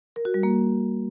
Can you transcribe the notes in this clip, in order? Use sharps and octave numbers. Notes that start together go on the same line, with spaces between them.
A#4
F#4
G3
A#3